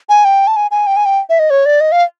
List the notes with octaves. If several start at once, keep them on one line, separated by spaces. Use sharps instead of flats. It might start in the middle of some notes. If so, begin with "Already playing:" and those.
G#5
G5
A5
G#5
G#5
G5
G#5
G5
E5
D#5
C#5
D5
D#5
F5